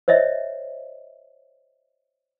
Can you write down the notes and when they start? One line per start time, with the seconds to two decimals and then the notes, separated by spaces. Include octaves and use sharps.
0.08 C5 C#5 D#5 E5